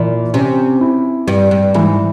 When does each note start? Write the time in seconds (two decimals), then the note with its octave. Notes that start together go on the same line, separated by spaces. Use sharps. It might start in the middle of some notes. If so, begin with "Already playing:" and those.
Already playing: A#2 E3
0.34 C3 C#4
0.81 E4
1.27 G2 G3
1.51 G2
1.74 G#2 E3